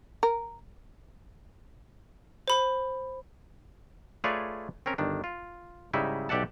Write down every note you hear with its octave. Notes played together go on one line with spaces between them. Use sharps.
A#4
C5 B5
A3 F4 G#4 B4 C#5 D5
C4 C#4 A#4
G1 D#3 D4
F4
G#2 C#3 G3 D#4 E4 E5
B1 G4 D5 E5 F#5 A5